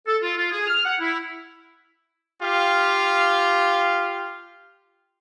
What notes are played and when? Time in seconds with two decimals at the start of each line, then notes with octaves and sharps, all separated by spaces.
0.07 A4
0.22 F4
0.36 F4
0.52 G#4
0.67 F6
0.85 F#5
1.00 E4
2.42 F4 G4 F5